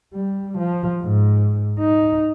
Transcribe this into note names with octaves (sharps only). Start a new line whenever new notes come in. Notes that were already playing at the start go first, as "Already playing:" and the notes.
G3
F3
G#2
D#4